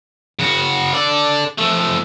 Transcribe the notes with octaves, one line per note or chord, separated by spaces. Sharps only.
C#3 F#4
A4 D5
F3 A3